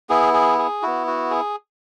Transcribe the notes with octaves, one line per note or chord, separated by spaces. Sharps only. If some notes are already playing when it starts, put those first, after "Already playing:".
B3 E4 G#4
G#4
G#4
B3 E4 F#4
F#4
G#4